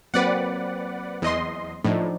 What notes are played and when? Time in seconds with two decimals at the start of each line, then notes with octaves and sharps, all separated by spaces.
0.14 F#3 A#3 C4 B4 D5 F#5
1.22 E2 D#5 C6
1.85 A2 F3 D4 D#4